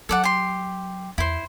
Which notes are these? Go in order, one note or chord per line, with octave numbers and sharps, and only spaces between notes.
F#3 A4 D5 F#5
G4 C6
E2 E4 C5